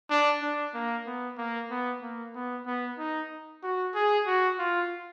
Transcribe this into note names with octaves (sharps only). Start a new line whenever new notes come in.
D4
D4
A#3
B3
A#3
B3
A#3
B3
B3
D#4
F#4
G#4
F#4
F4